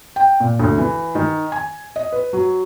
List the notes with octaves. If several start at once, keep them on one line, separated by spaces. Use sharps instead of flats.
G5
A#2
D2
E3
D#3
G#5
D#5
B4
F#3